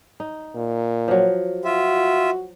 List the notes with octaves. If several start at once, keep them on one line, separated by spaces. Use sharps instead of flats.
D#4
A#2
F3 F#3
F4 F#4 E5